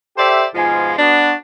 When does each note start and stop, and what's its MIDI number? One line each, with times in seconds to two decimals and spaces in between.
0.17 0.45 67
0.17 0.45 69
0.17 0.45 72
0.17 0.45 74
0.17 0.45 76
0.55 0.94 44
0.55 0.94 47
0.55 0.94 53
0.55 0.94 56
0.55 0.94 65
0.55 0.94 80
0.98 1.33 59
0.98 1.33 62
0.98 1.33 66